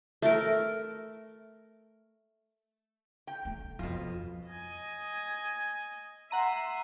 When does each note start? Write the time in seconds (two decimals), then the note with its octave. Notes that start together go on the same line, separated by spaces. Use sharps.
0.22 A3 A#4
3.27 G5
3.45 A3
3.79 F2 B2 F4
4.48 D#5 G#5
6.31 E5 F#5 A#5 C6 D#7